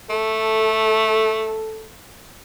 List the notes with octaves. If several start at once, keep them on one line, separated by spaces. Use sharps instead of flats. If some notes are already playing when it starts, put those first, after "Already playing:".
A3 A4